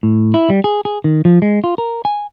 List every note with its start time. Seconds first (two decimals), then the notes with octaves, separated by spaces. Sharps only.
0.03 A2
0.34 E4
0.50 G3
0.64 G#4
0.85 G#4
1.04 D#3
1.25 F3
1.42 G#3
1.64 F4
1.78 A#4
2.05 G#5